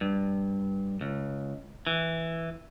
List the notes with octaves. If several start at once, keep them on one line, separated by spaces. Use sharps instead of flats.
G2
C#2
E3